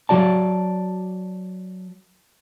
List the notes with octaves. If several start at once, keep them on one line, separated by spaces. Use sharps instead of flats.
F#3 F#4 D5 A5